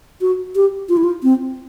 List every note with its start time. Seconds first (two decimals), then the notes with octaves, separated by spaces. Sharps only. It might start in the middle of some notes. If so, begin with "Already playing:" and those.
0.21 F#4
0.55 G4
0.89 F4
0.97 E4
1.04 F4
1.23 C4